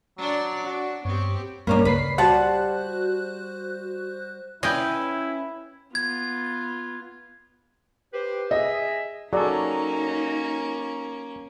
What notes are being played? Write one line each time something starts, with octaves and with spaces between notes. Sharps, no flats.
F#3 D4 C#5 D5
D4 F#4
G2 B3 C4 G4 C#5
G2 A#3 C#4 D4 B5
C#2 B4 B6 C7
G3 F#4 C5 F#5 A5 F#6
C#4 E4 B4 D#5 G5
B3 F4 G#6
G4 B4 C5
G#4 D#5 E5
F#3 A#3 C#4 D#4 G#4 A4 D5 D#5